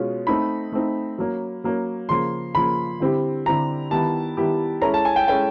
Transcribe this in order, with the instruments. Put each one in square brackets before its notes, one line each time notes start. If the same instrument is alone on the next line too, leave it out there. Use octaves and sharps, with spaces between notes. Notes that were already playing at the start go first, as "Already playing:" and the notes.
Already playing: [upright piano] B2 G#3 C#4 F4
[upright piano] A3 C4 D#4 [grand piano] B5
[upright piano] A3 C4 D#4
F#3 A#3 C#4
F#3 A#3 C#4
[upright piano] C#3 F3 A#3 [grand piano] C6
[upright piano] C#3 F3 A#3 [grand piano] B5
[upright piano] D3 G3 C4 E4 G4
[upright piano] D3 G3 C4 E4 G4 [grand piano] A#5
[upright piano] D#3 G3 B3 E4 G4 [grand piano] A5
[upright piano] D#3 G3 B3 E4 G4
[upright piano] G#3 C#4 E4 A4 [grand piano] A#5
[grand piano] A5
G#5
G5
[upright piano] G#3 C#4 E4 A4 [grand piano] G5